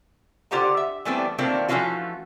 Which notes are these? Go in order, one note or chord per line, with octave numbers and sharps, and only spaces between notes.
D3 F4 G4 C5 F#5 A#5
E5
E3 G3 A3 B3 C4 D4
D#3 A3 A#3 C4 D4 F4
E3 F3 A3 C#4 F4 F#4